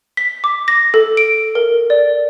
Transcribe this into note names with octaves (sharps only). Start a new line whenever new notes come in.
B6
D6
A#6
A4
D7
A#4
D5